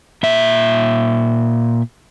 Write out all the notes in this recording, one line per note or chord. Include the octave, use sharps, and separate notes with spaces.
A#2 E5